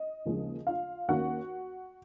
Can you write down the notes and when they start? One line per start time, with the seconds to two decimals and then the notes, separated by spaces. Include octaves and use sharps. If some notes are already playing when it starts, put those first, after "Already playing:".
Already playing: D#5
0.26 D#2 C#3 F3 G#3 C#4
0.67 F4 F5
1.08 D#2 D#3 A#3 C#4 F#4 F#5